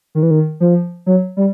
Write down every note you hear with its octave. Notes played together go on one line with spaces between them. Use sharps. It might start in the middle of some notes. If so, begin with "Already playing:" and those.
D#3
E3
D#3
F3
F#3
G3